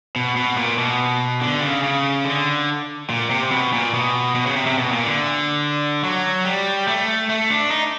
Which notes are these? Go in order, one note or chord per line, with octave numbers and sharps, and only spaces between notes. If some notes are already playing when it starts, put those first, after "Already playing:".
B2
B2
A#2
B2
D3
C#3
C#3
D3
A#2
C3
B2
A#2
B2
B2
C#3
C3
C3
B2
A#2
D3
F#3
G3
A3
A3
D4
D#4